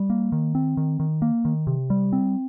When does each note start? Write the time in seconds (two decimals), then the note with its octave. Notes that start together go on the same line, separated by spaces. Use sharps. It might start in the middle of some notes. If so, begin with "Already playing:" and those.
Already playing: G3
0.10 A#3
0.32 D#3
0.55 C4
0.77 D#3
1.00 D#3
1.22 A#3
1.45 D#3
1.67 C3
1.90 G3
2.13 C4